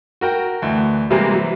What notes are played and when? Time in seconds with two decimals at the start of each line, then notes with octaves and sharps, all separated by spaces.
0.21 F#4 A#4 G5
0.62 D2 E3
1.11 C3 E3 G3 G#3 A#3 C4
1.34 E3 F#3